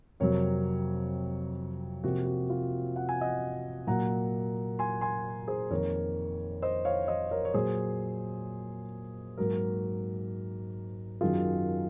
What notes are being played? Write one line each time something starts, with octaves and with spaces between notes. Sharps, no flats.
F2 C3 F#3 A#3 A#4 C#5
C3 F3 A#3 F#4
F#4
F4
F#5
G#5
D#5 F#5
A#2 F#3 A#3 F#5 A#5
G#5 C6
G#5 C6
G#4 C5
F2 D#3 A#3 A#4 C#5
C5 D#5
C#5 F5
C5 D#5
A#4 C#5
C#5
A#2 F#3 A#3 G#4 C5
G#2 F#3 A#3 F#4 A#4
F#2 D#3 F#3 F4 G#4